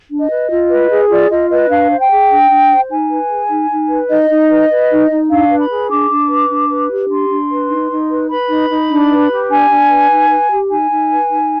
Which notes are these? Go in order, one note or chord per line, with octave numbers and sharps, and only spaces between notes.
D4
D#5
B4
F4
B4
G#4
F4 D5
F4 D#5
B4 D#5
D4 F5
C5
G5
G#4
D4
D4
C5
D#4 G#5
B4
G#4
D#4
D#4
B4
D#4 D#5
D#4
B4
B4
D#4
D#4
D4 F5
B4
B5
G#4
D4 D6
D4
B4
D4
B4
G4
D4 C6
D4
B4
D#4
D#4
B4
B4 B5
D#4
D#4
D4
B4
G4
D4 G#5
D4
B4
D#4
B4
G4
D#4 G#5
D#4
B4
D#4